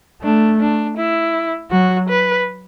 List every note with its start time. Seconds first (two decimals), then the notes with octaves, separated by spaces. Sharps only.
0.23 A3 D4
0.61 D4
0.97 E4
1.71 F#3 F#4
2.09 B4